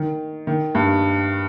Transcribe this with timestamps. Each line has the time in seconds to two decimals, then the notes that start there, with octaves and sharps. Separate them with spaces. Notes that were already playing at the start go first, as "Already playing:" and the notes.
Already playing: D#3
0.47 D#3
0.75 G2